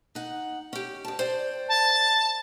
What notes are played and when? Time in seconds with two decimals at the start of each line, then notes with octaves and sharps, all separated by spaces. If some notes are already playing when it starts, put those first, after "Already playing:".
0.15 D#4 F#5
0.73 C#4 G4
1.05 D2 A5
1.19 C5 D5 G5
1.68 A5